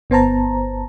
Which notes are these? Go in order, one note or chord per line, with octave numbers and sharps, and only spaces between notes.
G1 B3 C5 A5 A#5